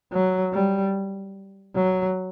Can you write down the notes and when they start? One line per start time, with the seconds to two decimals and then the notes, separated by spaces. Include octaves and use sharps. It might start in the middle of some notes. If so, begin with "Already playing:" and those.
0.12 F#3
0.53 G3
1.76 F#3